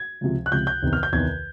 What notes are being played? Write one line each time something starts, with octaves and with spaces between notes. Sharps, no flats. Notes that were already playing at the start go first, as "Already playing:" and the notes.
Already playing: G#6
C#2 C3 F3
F#6
C#2 C3 F3 G6
G6
E2 C3 D#3
F6
G6
E2 C3 D#3 G#6